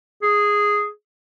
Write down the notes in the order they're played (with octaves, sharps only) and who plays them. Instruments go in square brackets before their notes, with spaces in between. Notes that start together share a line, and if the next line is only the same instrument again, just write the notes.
[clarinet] G#4